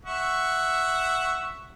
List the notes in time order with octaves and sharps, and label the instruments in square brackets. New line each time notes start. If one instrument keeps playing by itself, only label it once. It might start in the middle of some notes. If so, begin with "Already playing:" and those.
[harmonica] E5 F#5 C#6